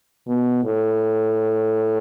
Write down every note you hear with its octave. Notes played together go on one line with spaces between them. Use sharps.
B2
A2